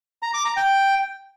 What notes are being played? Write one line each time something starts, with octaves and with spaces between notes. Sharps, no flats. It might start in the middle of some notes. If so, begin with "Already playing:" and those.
A#5
D6
A#5
G5